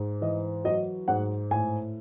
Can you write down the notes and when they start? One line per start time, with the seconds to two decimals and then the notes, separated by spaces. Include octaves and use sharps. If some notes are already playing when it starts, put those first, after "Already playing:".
Already playing: G#2
0.21 E3 D#5
0.65 F#3 D#5
1.08 G#2 F#5
1.51 A2 G#5